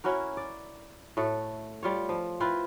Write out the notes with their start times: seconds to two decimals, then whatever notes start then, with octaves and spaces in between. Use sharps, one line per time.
0.04 C#4 E4 F#4 A#4
0.37 D5
1.17 A2 A3 F#4 A4
1.83 G3 F4 C#5
2.09 F3
2.40 C4 E4 F4 B4